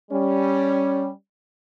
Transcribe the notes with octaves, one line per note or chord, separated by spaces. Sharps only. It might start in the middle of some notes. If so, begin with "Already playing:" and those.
G3 C#4